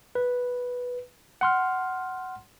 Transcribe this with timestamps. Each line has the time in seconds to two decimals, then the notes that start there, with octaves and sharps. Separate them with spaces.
0.15 B4
1.41 F#5 C6 F6